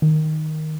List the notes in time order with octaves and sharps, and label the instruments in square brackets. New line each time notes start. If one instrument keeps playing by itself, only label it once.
[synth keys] D#3